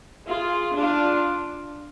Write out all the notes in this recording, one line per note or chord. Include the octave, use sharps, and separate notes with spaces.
F4 G#4
D4 F4